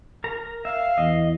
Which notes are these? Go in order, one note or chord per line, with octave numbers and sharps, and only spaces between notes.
A#4 A#5
E5 F5
E2 D#5